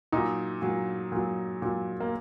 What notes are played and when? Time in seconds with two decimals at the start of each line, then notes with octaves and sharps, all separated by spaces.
0.12 A#2 F#3 D#4
0.62 A#2 F#3
1.12 A#2 F#3
1.62 A#2 F#3
2.00 A#3